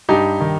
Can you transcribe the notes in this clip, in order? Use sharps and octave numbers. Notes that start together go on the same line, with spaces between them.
G2 D#4 G4
D#3